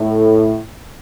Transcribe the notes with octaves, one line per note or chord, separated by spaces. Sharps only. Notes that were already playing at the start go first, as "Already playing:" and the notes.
Already playing: A2